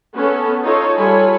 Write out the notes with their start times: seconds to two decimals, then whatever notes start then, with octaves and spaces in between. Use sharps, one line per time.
0.15 B3 C#4 A4
0.62 D#4 F4 A4 C#5
0.98 G3 F4 A4 C#5 G#5 B5